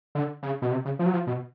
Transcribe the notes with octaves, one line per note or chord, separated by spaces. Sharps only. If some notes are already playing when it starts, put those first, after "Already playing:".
D3
C#3
B2
C3
C#3
F3
F#3
F3
B2